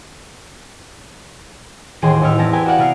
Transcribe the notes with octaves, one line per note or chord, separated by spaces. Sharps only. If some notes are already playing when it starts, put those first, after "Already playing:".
E1 A1 D#2 G#4 G5 C6
A1 D#4 E4 F6
E2 C4 E4 A5 A#6
G4 A#4 B4 G5 G#5
F#4 A#4 D5 F5 F#5
C3 B3 A#4 F6 C7